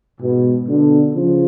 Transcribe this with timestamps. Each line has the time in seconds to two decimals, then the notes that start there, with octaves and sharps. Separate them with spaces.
0.19 G#2 B2
0.67 B2 D3
1.14 C#3 F3